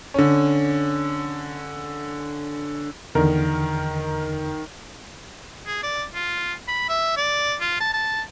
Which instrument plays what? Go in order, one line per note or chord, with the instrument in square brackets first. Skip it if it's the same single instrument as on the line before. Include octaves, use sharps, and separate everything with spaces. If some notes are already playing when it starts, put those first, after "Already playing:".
[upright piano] D3 C#4
[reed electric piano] E2 D3 [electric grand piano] D#3 A#4
[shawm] G#4
D5
F4
B5
E5
D5
F4
A5
A5